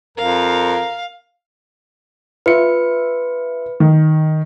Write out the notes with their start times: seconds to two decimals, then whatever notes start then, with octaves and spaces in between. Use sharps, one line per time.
0.18 F2 A#4 F5
2.46 F4 B4 E5 C#7
3.80 D#3